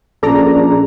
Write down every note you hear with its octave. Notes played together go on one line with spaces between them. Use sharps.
A#1 C#4 G#4 A4 D5 A#5